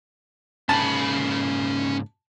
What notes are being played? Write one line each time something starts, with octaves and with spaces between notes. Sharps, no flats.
G#2 C#3 A#3 C#4 A5 B5